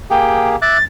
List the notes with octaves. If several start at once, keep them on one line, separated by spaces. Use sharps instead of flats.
A#3 G4 G#4 G5
E5 D6 F#6 A6